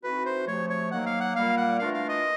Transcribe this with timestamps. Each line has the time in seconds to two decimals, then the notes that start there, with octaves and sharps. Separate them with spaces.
0.03 E3 A3 C4 D#4 F#4 B4
0.25 C5
0.47 C3 F3 A3 C#5
0.70 C#5
0.91 D#3 F#3 A#3 F#5
1.06 F5
1.20 F#5
1.35 A#2 G3 A#3 F5
1.57 F#5
1.79 E3 A3 D4 F4 A#4 F5
1.94 F5
2.09 D#5